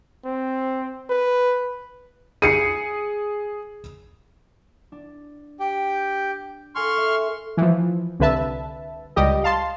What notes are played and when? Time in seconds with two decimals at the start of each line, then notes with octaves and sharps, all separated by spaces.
0.25 C4
1.09 B4
2.42 G#4 C7 C#7 D#7
4.92 D4
5.60 G4 G5
6.75 A4 F5 G#5 C6 C#6 F6
6.97 E5
7.57 E3 F3
8.20 C2 D3 B4 E5 A5
9.16 C#2 G3 G4 D#5
9.44 F5 A5 C6